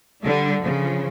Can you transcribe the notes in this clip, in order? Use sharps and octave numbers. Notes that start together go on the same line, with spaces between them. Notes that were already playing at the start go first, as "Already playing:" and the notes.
D3 G3 D4
C#3 F3